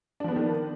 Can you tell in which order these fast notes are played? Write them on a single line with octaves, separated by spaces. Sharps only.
D4 F3 B3 A#3 D#3